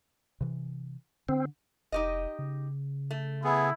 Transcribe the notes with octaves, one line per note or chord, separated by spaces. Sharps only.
C3 E3
D3 C4
F1 D#4 G4 D#5
C#3
A3
B3 E4 G#4